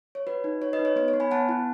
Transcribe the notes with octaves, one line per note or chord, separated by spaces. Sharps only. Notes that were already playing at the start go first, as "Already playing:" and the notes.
C#5
F#4 B4
D#4
F#4 C#5
B4 D#5
D#4
C#5
B3 C#5
C#5
B3
G#5 B5
B3 F#5 A5
E4